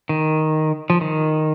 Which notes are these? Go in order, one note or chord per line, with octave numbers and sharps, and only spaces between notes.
D#3
F3
D#3